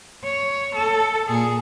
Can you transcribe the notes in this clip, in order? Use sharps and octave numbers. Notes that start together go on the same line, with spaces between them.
C#5
A4
A#2 G#4